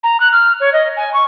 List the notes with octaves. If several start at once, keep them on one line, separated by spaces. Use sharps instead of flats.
A#5
F#6
F6
C#5
D#5
G#5
C#6